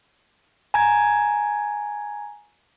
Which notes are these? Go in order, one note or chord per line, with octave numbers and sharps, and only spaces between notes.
G#5 A#5 G#6